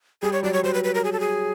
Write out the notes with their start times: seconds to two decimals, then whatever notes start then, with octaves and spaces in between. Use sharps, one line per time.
0.22 G3 G#4
0.33 C#5
0.43 F#3 D5
0.53 C#5
0.64 F#3 C5
0.74 B4
0.84 B4
0.95 A#4
1.04 G#4
1.12 A4
1.20 G#4